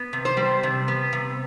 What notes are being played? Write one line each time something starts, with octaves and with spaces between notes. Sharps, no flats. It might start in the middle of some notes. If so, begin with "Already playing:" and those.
Already playing: B3
C3
C5
G3
C3
B3
C3